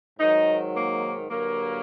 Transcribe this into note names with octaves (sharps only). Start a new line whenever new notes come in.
G#2 D#3 F#3 D#4
A#3
G2 D3 F#3 A#3